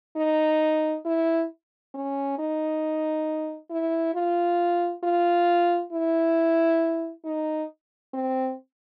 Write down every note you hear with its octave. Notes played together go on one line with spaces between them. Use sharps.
D#4
E4
C#4
D#4
E4
F4
F4
E4
D#4
C4